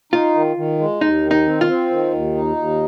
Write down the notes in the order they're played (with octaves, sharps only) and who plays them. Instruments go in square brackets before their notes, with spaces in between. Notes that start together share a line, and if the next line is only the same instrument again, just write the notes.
[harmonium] D#4 [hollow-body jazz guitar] F4
[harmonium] D#3
D#3
G#3
[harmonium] D#2 [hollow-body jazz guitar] D#4
[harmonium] D#3
[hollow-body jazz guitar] D#4
[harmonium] C4
[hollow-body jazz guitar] F4
[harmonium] C4
D#3
D#2
D#4
D#2